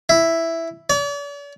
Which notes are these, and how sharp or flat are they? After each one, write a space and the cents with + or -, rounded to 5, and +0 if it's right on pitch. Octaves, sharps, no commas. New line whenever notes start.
E4 +0
D5 -45